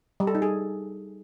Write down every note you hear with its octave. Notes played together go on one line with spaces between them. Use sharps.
G3
A4
D#4
G#4